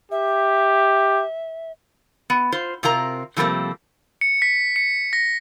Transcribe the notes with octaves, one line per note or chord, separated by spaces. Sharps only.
G4 E5
B3
F4 C5
C3 C4 F4 A#4 A#5
C3 F3 G3 A3 A#3 C4
C#7
B6
C#7
A#6